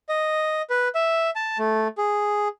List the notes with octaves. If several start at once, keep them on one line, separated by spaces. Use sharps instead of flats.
D#5
B4
E5
A5
A3
G#4